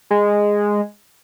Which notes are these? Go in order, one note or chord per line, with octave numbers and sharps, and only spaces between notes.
G#3